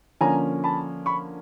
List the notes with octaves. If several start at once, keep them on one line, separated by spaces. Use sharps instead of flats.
D3 F3 A#3 C#4 G#5 A#5
A5 B5
B5 C#6